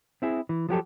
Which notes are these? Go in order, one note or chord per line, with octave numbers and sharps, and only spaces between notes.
C4 E4 G#4
E3
F3 F#3 G4 A4